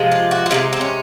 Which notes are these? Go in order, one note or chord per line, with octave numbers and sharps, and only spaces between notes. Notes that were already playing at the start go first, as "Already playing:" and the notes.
Already playing: C3 F3 G#3
F4
F#4
F4
C3 F3 G#3 D#4
C4
C#4